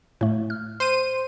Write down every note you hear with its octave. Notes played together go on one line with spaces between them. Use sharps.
A2 A3
F6
C5 D#7